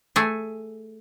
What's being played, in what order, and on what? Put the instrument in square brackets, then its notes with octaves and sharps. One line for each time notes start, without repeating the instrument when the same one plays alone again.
[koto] A3 G#4